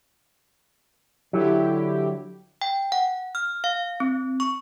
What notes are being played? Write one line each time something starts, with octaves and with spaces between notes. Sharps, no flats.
D3 F#3 E4 G4
G5
F#5
F6
F5
C4
C#6